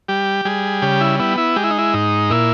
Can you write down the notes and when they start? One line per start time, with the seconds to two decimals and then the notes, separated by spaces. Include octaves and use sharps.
0.08 G3 G4
0.45 G3 G#4
0.82 C#3 G4
1.01 E4
1.19 B3 E4
1.38 E4
1.56 G#3 G4
1.64 E4
1.71 D#4
1.78 E4
1.94 G#2 D#4
2.30 A#2 E4